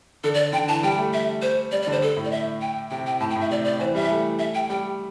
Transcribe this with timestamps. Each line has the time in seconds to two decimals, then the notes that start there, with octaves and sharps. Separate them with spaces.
0.24 D3 A4
0.34 D5
0.53 D3 G5
0.68 E3 A5
0.83 G3 G5
0.98 A3
1.13 E5
1.42 C5
1.72 G3 D5
1.82 D5
1.87 D3
1.92 C5
2.02 A4
2.17 A2
2.25 D5
2.31 E5
2.61 G5
2.91 C3 G5
3.07 G5
3.20 A2 A5
3.30 G5
3.36 A2
3.41 E5
3.51 C3 D5
3.65 D5
3.80 E3 C5
3.95 G3 E5
4.10 A3
4.39 E5
4.55 G5
4.70 G3 G5